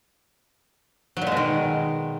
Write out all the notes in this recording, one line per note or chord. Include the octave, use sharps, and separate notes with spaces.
F#3
A#2
G#3
B2
D#3